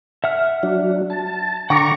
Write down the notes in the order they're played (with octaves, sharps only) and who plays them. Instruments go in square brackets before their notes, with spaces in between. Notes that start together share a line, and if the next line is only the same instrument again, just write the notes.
[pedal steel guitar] E5 F#5 F6
[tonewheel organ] F#3 D4
A5
[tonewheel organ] D3 A#5 C#6 [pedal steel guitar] F#5 G5 D6